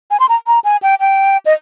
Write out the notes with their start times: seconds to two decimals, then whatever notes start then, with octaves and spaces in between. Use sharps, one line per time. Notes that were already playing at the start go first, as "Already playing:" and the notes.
0.11 G#5
0.20 C6
0.29 A#5
0.47 A#5
0.64 G#5
0.82 G5
1.00 G5
1.46 D#5